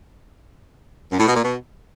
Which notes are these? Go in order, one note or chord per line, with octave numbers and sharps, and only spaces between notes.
F#2
A2
B2
A#2
B2